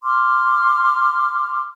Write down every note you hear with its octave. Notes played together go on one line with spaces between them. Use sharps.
C6 D6 F6